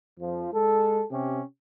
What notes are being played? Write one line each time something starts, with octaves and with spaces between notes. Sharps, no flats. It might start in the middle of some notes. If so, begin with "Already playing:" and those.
F2 F3
G#3 A4
C3 C#4 G4